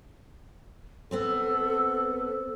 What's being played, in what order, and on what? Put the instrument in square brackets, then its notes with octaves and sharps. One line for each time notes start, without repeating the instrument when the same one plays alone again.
[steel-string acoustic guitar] B3 C4 C5 [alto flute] A4